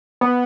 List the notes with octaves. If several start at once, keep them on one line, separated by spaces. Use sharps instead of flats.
B3